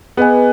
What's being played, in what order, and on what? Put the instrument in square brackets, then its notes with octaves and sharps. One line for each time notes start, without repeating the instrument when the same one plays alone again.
[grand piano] B3 [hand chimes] G#4 B4 D#5 G#5